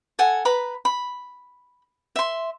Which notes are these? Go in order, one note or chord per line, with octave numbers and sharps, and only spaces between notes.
A4 F#5 G#5
B4 A#5 B5
B5
E5 C6